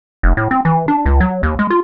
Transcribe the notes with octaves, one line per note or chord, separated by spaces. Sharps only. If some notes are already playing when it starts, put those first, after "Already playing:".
F1
A2
C4
E3
D4
C#2
F#3
D#2
G#3
F4